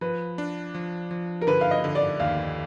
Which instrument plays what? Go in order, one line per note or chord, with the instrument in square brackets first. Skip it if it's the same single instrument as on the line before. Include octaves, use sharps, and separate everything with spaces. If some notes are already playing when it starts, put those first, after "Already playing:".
[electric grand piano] F3 [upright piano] B4
[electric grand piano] D4
F3
F3
[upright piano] A#4
[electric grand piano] D3 [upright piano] B4
[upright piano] F5
D#5
[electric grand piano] D3
[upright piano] D5
[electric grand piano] D#2 [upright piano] F5